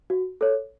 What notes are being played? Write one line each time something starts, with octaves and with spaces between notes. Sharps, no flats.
F#4
A4 C#5